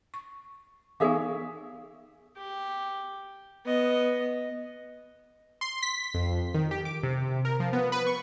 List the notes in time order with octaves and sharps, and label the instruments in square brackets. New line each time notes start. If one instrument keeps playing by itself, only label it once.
[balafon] C#6
[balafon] E3 B3 D#4 [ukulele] G#4 E5 F5
[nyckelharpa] G4
B3 D#5
[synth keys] C6
B6
F2
D#3
G4
D6
C3
A#4
F3
B3
B4
C#6